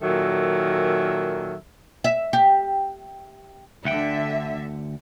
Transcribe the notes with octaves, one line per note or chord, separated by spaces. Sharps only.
A#2 D#3 F#3 A4 E5
E5
G4
D2 D3 E5 F#5 G5